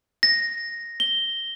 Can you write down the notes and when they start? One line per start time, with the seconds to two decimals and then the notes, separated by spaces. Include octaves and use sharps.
0.23 A#6
1.00 G7